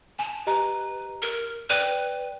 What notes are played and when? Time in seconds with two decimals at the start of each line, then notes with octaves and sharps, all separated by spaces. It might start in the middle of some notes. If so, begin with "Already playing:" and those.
0.19 G#5 A5
0.47 G4 B4 D#5 A#5
1.22 A#4
1.70 B4 D5 G5 D#7